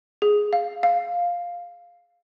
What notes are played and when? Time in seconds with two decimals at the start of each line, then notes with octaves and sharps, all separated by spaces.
0.22 G#4
0.53 F5
0.83 F5